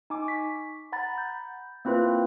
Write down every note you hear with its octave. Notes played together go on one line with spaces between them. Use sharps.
D#4 G#5 D6
C#6 B6
F#5 A#5 B5 A6
G6
A#3 C4 E4 F4 B4